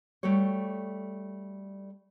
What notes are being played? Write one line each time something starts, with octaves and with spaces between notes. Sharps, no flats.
G3 A3 F#4 A4 C#5